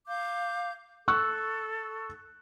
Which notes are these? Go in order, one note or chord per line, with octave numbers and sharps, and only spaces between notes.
F5 D6 G6
A4 C#6 E6 F#6